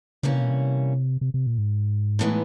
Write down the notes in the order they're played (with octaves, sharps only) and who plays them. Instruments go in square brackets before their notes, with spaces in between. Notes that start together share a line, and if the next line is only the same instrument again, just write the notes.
[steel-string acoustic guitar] G2 E3 G3 A#3 C#4 [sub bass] C#3
[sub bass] C3
B2
C3
C3
C3
A#2
G#2
[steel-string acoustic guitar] A2 E3 G#3 B3 D#4